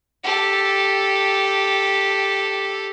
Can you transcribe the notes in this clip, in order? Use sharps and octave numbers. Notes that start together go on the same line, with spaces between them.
G4 A4